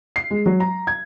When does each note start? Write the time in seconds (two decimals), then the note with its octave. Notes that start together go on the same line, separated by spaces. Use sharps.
0.16 C7
0.31 G#3
0.46 F#3
0.60 A#5
0.87 G#6